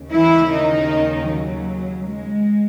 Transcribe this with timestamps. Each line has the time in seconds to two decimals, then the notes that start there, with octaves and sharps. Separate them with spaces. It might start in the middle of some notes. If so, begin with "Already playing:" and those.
Already playing: D#2 C#3
0.12 E3 E4
0.51 D#3 D#4
1.29 F#3
2.07 G#3